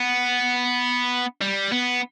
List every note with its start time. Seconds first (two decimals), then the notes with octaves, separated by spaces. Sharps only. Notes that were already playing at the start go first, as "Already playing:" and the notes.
Already playing: B3
1.41 G3
1.72 B3